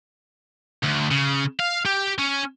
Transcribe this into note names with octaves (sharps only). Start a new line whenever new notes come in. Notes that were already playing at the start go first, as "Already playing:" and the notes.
D2
C#3
F5
G4
C#4